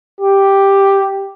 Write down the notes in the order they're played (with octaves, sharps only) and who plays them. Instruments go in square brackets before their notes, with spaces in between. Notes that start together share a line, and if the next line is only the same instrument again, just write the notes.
[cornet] G4